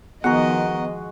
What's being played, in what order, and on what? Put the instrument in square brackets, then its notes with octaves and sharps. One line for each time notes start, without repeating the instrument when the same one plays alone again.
[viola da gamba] D#3 F3 D#5 [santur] G#3 F#4 [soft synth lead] B3 [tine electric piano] F#5 A#5